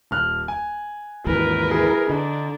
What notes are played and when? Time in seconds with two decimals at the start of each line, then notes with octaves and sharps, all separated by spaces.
0.11 D#1 F6 F#6
0.48 G#5
1.27 D#2 G#2 E3 A#4 B4
1.71 E4 G#4
2.10 D3 D4 D#4